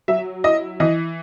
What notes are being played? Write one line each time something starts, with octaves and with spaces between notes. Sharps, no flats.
F#3 E5
E4 D#5
E3 D#5